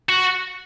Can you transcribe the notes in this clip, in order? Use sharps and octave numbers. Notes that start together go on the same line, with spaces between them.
F#4